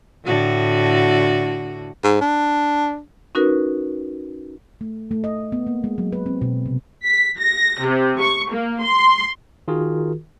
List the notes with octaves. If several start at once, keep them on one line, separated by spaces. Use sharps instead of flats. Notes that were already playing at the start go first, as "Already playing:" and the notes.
A2 D3 F#4
G#2
D4
C#4 D#4 F#4 A#4 B4
A3
A3
D#5
B3
A#3
G#3
F#3
B4
C4
B2
C3
B6
A#6
C3
C#6
A#3
C6
D#3 F4 F#4 G#4 A#4